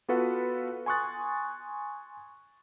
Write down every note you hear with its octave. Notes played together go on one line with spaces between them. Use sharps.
B3 F4 F#4 A4 B4 F#5
G#5 C6 C#6 D#6 F#6 A6